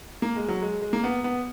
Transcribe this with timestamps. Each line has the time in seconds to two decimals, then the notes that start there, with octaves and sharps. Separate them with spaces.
0.22 A#3
0.36 G#3
0.48 F#3
0.62 G#3
0.81 G#3
0.93 A#3
1.04 B3
1.24 B3